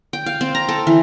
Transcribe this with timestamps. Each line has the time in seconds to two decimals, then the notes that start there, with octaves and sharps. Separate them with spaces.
0.13 G5
0.26 F5
0.41 C4
0.55 A#5
0.68 A4
0.87 E3